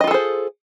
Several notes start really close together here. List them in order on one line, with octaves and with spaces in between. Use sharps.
D#5 F4 A4 G#4 C5